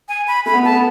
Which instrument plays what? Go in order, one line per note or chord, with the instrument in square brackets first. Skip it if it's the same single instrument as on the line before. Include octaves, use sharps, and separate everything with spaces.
[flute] G#5
B5
[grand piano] A3 [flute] B5
[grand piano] B3
[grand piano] A3 [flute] A5
[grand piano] B3